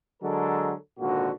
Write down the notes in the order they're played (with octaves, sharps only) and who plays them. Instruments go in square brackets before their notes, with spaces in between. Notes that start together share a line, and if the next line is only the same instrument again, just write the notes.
[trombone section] D3 F#3 G#3 A4 A#4
G#1 A#2 D3 F#4